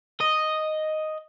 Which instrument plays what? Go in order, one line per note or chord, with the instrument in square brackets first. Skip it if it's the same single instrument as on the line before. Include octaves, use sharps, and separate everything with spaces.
[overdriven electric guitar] D#5